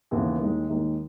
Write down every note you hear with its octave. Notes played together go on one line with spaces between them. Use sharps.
D#2 C#3 E3 B3
D#2 D#3 G#3 D#4
D#2 D#3 G#3 D#4